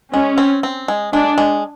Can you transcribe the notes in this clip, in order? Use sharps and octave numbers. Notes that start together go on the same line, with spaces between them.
G#3 C#4
C4
C4
G#3
G#3 D4
G#3